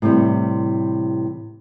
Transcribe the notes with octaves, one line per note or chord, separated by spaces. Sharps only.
A2 C3 E3 G3 C5